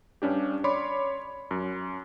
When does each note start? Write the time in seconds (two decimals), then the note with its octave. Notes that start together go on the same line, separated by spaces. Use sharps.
0.22 G2 C#4 D4 G4
0.64 C#5 D5 B5 C6 D6
1.51 F#2